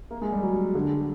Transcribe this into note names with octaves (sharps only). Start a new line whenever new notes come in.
A#3
G#3
G3
F#3
D3